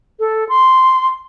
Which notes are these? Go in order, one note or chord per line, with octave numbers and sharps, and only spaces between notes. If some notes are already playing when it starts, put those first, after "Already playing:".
A4
C6